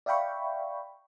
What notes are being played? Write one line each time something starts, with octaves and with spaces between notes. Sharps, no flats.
D5 E5 F5 G5 B5 C#6